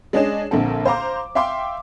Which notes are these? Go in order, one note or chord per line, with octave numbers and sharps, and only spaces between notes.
G#3 C#4 D4 G#4 D#5 E7
A#1 D3 A#3 C4 A4
C5 F5 A#5 D6
E5 F5 G5 C6 D6